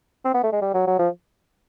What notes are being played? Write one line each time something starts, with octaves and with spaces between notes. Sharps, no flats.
C4
B3
A3
G#3
G3
F#3
F#3
F3